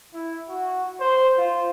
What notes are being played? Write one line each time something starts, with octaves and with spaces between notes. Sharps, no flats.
E4
F#4
C5
F4